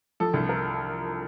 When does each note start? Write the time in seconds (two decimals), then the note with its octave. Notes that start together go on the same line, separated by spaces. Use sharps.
0.20 F3 A4
0.33 C2
0.49 A#4